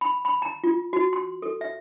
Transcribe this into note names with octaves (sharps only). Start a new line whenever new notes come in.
B5
B5
A#5
F4
F#4
C6
A4
E5